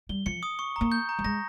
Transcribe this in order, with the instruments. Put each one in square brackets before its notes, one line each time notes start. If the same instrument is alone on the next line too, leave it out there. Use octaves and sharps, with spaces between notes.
[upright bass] G3 [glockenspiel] G7
[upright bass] F3 [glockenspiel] C#7
[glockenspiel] D#6
C#6
[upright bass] A#3 [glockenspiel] A#5
[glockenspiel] G6
A#5
[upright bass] G3
[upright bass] G#3 [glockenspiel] A#6